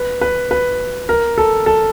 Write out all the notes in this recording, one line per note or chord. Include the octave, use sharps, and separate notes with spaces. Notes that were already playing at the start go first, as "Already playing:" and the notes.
Already playing: B4
B4
B4
A#4
A4
A4